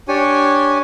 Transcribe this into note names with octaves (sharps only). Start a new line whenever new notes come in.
D4 G4 C#5 G#5